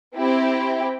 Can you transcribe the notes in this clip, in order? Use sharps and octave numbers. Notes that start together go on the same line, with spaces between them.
C4 E4 G4